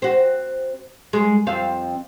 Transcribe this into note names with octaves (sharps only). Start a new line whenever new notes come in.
C4 F#4
G#3
F2 C4 F5